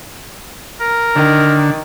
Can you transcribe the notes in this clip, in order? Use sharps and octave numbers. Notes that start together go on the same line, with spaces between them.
A#4
D3 D#3